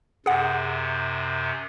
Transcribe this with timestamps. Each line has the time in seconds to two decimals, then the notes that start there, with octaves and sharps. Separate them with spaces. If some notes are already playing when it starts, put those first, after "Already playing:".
0.26 F#2 C3 G#4 F#5